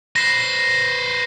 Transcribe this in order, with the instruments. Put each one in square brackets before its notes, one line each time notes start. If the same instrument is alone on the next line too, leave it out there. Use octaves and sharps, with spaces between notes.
[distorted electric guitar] B4 C5 [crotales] A#6 C7